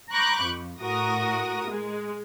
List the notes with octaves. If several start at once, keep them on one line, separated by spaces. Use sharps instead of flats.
A#5 B5 C#6 D6 F#6 G6
F2
A2 F#4 A#4 D#6 A#6
G#3